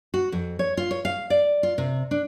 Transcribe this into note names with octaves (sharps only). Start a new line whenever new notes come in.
F#4
F2
C#5
F4
C#5
F5
D5
F4
C3
D4